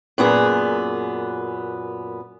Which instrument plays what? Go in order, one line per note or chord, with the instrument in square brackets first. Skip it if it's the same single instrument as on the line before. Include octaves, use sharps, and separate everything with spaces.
[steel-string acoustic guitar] F#2 A#2 B3 G#4